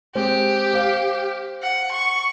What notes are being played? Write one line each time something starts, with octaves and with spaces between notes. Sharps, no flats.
G#3 C4 G4
C5 F5
F#5
C#6